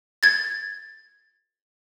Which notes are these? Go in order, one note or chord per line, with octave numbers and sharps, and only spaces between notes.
G#6 A6